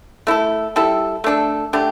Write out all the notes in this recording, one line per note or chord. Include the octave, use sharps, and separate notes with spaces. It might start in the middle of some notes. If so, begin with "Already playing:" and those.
A3 E4 A4
G3 E4 A4
A3 D4 A4
D3 A3 D4 G4